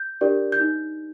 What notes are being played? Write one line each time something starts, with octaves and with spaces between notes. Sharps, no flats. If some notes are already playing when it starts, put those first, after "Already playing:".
Already playing: G6
D4 G4 A#4 D5
G6
D#4